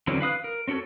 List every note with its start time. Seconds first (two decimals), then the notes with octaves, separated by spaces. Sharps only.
0.07 D3 E3 F#3 C4 C#4
0.21 B4 F5 D#6 F#6
0.44 A#4
0.68 C4 C#4 F#4 A4 C#5